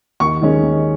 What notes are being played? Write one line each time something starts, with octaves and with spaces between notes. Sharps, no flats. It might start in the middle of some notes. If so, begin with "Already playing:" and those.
D#2 C#6
D#3 G#3 C#4
D#2